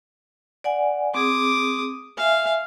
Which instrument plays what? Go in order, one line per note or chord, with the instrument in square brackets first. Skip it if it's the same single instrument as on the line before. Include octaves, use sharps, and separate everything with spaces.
[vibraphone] D5 F#5 G#5
[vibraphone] C4 G#4 [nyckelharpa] D6 D#6
[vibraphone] E5 G#5 [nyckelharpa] F5